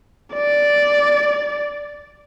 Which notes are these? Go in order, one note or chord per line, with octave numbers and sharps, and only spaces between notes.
D5